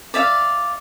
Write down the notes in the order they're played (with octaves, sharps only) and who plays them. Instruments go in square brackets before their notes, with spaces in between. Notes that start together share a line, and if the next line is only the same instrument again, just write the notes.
[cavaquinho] D5 E5 F5